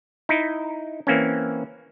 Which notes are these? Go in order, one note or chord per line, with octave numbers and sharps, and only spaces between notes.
D#4 E4
E3 A#3 C4 C#4